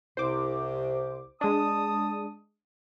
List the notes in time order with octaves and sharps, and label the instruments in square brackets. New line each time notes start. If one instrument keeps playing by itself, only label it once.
[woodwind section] C2 C3 [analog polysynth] C5 D6
[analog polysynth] G#3 D4 [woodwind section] A5 D#6